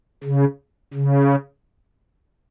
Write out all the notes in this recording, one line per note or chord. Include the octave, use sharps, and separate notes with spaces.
C#3
C#3